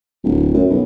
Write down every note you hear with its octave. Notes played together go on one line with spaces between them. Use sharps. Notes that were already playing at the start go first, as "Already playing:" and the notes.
D1
F#2
B1